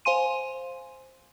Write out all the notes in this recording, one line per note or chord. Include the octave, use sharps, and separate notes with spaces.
C5 F5 G#5 C6 D#7